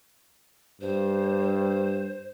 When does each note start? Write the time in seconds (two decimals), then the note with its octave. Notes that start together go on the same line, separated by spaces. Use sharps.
0.81 G2 C5